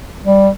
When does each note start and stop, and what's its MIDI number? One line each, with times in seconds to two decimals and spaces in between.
0.25 0.49 55